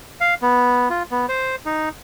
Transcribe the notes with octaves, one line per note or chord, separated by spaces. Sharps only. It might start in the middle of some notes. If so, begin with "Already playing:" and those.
F5
B3
F4
B3
C5
D#4